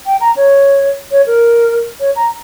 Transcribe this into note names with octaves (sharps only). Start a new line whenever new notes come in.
G5
A#5
C#5
C#5
A#4
C#5
A#5